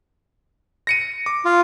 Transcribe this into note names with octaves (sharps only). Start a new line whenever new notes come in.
A#6 C#7 D#7
D6
F4